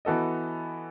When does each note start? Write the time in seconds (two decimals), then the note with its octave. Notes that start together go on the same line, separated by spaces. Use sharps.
0.05 E3 B3 F#4 A4 D#5